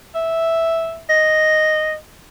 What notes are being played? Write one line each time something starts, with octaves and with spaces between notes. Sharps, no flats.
E5
D#5